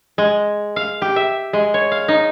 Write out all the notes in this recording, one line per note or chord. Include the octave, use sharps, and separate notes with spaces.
G#3
F5
G4
E5
G#3
C#5
F5
D#4